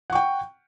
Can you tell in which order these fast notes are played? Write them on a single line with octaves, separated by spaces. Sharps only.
F#5 C#6 G5